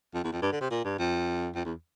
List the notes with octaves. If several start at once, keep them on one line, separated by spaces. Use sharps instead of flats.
F2
E2
F2
G2
D3
C3
A#2
G2
F2
F2
E2